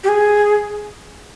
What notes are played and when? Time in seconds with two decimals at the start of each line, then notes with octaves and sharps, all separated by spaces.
0.04 G4
0.08 G#4